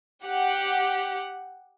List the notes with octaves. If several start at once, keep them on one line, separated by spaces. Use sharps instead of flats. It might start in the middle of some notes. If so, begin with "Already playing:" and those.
G4 F#5